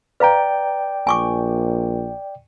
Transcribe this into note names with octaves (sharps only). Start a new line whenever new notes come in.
B4 D5 F5 G5 A#5
A#1 G#5 C#6 D6